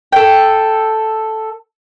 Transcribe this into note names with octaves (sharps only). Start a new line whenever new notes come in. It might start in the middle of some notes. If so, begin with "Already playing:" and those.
A4 G5